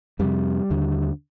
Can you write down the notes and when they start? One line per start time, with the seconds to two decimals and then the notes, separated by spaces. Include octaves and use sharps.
0.19 F2 C3 G3
0.70 D#2 D3